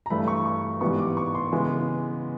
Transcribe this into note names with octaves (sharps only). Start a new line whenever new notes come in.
A#5
G2 E3 A3 B5
C#6
C#6
G#2 E3 G3 B3 C#6
D6
C#6
C6
C#3 E3 G#3 B3